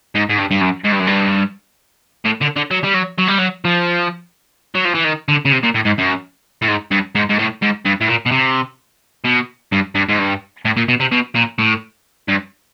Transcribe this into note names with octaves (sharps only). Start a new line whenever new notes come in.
G#2
G#2
G2
G2
F#2
G#2
G2
F#2
G2
A2
D3
D3
F#3
G3
F#3
F#3
G3
F#3
F3
F#3
F3
E3
D#3
D3
C#3
C3
A#2
A2
G#2
F#2
A2
G#2
G2
G#2
G#2
A2
G#2
G2
A2
A#2
B2
C3
B2
G2
G2
G#2
G2
A2
A#2
B2
C3
B2
A#2
A2
G2